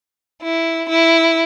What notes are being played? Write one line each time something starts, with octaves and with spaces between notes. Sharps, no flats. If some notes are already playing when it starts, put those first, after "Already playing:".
E4
E4